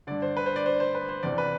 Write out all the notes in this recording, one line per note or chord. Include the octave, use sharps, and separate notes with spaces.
G2 D3 D5
C5
B4
C5
D5
C5
C5
B4
C5
E2 C3 E3 D5
B4